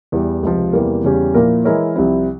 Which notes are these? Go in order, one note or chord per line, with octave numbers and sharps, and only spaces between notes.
E2 E3 G3
C#2 C3 F3
E2 C3 E3 G3 A#3
E2 C#3 G3 C#4 G4
A#2 F3 A#3 E4 A#4
E3 G#3 E4 A#4 C#5
C2 C3 F3 C4 E4